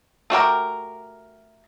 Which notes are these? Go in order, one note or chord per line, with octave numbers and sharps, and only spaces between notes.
A3 F#4 G4 A#4